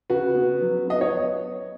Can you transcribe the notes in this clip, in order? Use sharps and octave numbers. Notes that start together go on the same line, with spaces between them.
C#3 F#4 B4
B3
F#3
B3 D#5
C#5